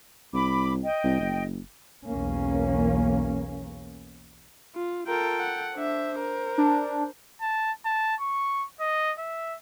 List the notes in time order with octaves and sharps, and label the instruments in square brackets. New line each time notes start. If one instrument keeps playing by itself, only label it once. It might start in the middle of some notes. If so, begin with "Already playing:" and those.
[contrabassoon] C2 [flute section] B5 D6
[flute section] D#5 G5
[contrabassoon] C2
F#1
[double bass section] B1 E2 A#3 C#4
[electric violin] F4
[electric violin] F4 A#4 [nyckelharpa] A4 G5
[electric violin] F#5
[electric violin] D4 E5 [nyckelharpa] C5
[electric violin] A#4
[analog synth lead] D4
[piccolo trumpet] A5
A5
C#6
D#5
E5